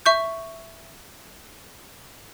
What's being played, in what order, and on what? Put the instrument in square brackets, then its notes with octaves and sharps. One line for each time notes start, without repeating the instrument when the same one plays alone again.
[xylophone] E5 C#6 G6